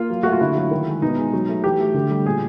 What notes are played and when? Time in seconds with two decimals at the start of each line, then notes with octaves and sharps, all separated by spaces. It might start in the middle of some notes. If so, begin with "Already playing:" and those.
Already playing: A#3 F4
0.10 F#3
0.23 A3 F#4
0.32 F4
0.41 D3 E4
0.56 F#3
0.71 D#3
0.87 G#3
1.02 B2 D#4
1.18 G#3
1.33 F#3
1.49 A3
1.64 E3 G4
1.80 A3
1.94 D3
2.11 G3
2.26 A#2 G#4